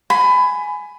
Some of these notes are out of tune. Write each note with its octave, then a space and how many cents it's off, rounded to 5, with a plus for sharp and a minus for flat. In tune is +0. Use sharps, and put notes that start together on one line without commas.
G#5 +10 B5 +20